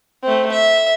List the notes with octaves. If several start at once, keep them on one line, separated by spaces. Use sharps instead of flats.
A3 C4
E5